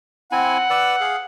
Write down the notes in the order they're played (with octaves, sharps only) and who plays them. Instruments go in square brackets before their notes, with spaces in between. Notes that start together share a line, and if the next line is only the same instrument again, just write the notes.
[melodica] C4 E4 G#5 [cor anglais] F#5
[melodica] B4 D5 E6
G#4 F5